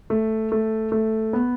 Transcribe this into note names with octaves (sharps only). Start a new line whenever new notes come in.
A3
A3
A3
B3